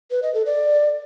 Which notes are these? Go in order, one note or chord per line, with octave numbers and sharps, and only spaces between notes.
B4
D#5
A4
D5